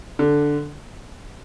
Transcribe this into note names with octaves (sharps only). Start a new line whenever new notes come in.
D3